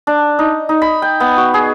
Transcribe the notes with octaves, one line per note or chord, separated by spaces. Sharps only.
D4
D#4
D#4
B5
G5
B3
F#4
G#4